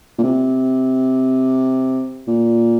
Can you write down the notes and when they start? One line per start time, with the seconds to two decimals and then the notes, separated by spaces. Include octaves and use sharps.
0.18 A#2
0.23 C3
2.27 A#2